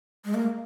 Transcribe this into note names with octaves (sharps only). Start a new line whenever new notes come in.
G#3
A#3